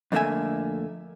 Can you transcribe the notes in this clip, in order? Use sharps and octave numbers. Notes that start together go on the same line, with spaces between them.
F2 D3 A3 A#3 E5 G#5